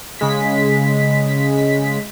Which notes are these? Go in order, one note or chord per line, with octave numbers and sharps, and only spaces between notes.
C#3 G#3 B6